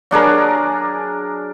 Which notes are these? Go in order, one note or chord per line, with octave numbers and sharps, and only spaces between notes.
F#3 D4 G#4 A#4